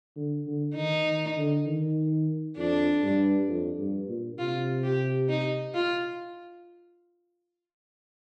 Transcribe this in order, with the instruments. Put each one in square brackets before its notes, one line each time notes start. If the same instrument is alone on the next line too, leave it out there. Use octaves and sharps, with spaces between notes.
[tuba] D3
D3
[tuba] D#3 [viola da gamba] D#4
[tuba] D#3
D3
D#3
[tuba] F2 [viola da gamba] D4
[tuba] G2
F2
G2
A#2
[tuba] C3 [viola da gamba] F4
[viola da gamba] G4
D#4
F4